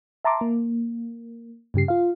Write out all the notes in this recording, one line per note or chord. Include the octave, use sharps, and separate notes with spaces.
E5 A5 A#5 C6 D6
A#3
G2 C#3 G4 C7
F4 F5